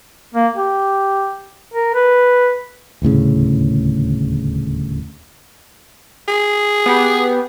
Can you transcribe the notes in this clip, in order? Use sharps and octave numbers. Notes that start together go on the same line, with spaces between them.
A#3
G4
A#4
B4
D#1 D2 A2 C#3
G#4
B3 G4